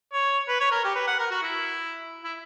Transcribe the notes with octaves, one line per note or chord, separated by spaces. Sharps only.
C#5
B4
C#5
A#4
G4
B4
F#5
A#4
F#4
E4
E4